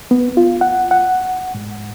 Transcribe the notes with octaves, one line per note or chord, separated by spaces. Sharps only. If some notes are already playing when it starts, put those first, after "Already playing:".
B3
F4
F#5
F#5
G#2